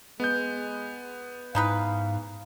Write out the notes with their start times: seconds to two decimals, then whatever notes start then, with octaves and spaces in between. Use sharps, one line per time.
0.20 G#3 B3 G6
1.55 G#2 E3 D#4 B4 F5